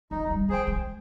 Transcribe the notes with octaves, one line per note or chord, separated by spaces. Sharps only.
G#3 D#4
G#3
G3
G#3 G#4 C5 G5
G#3